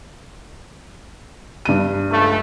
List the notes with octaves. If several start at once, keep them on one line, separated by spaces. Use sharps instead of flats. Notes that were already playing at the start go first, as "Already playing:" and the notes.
G2 D#7
C#2 A3